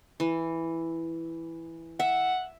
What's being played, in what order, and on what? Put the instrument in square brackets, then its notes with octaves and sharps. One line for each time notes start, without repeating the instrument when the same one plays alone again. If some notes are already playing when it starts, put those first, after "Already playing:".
[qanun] E3
[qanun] E5 [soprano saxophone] F#5